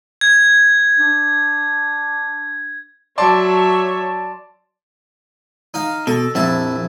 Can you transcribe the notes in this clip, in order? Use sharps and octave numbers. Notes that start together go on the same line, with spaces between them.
G#6
D4
F#3 C#5 D5 E5 A5 C6
D#4 F5
B2 A4
A#1 F2 E4 A5